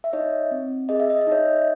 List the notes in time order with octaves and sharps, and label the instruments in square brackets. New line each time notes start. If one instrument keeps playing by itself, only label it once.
[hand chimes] E5
D#4 C#5 D#5
C4
G#4 D#5
E5
D#5
E5
D#4 C#5 D#5